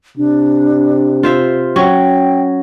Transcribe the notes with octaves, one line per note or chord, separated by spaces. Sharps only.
C3 D4
F4 C5 E5
F#3 C#4 G5